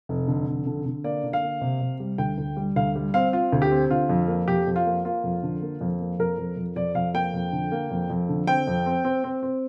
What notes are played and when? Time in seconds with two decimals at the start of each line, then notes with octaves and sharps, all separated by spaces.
0.09 F1
0.28 D3
0.48 F1
0.67 D3
0.86 D3
1.04 A#3 D5
1.24 D3
1.33 F5
1.43 A#3
1.61 C3
1.81 C3
2.00 G3
2.18 D2 G5
2.38 D2
2.57 G3
2.76 D2 F5
2.96 G3
3.14 C4 F5
3.33 C4 F4
3.52 D2
3.62 G4
3.71 C4
3.90 D3 F4
4.09 F2
4.28 A#3
4.48 F2 G4
4.67 F2
4.76 F4
4.86 A#3
5.05 A#3 F4
5.24 F2
5.43 D3
5.62 A#3
5.81 F2
6.00 A#3
6.19 F2 A#4
6.38 F2
6.57 F2
6.76 F2 D5
6.95 F2 F5
7.14 A#3 G5
7.34 F2
7.52 D3
7.72 A#3
7.91 F2
8.10 F2
8.29 D3
8.47 C4 G5
8.67 F2
8.86 C4
9.05 C4
9.24 C4
9.43 C4